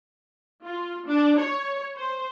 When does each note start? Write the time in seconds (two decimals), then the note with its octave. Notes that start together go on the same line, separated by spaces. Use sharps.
0.64 F4
1.08 D4
1.39 C#5
1.96 C5